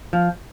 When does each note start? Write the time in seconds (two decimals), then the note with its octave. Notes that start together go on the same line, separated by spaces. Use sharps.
0.13 F3